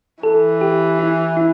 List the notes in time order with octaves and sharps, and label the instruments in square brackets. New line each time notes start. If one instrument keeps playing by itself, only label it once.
[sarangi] E3 [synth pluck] A4
[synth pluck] G4
E4
E4